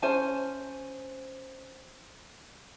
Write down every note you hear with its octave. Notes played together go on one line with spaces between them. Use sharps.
C#4 C5 G#5 A5